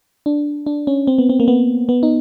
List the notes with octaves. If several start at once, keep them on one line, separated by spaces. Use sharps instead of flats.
D4
D4
C#4
C4
B3
C4
A#3
B3
B3
D#4